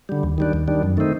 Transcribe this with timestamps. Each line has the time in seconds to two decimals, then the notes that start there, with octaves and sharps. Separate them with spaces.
0.09 D3 G3
0.23 D#2
0.38 D#3 G3 D4
0.53 D#2
0.68 D#3 G3 D4
0.83 F#2
0.97 D#3 A3 C4 D#4